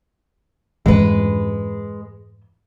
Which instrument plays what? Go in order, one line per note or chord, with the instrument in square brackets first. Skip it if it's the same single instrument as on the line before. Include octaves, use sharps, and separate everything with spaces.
[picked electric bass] F2 G#2 E3 [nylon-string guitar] G#3 B4